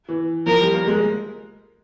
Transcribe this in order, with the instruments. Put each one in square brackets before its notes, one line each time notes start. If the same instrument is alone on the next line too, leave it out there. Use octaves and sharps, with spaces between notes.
[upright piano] E3
[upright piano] F3 [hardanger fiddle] A#4
[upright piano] G3
A#3
G#3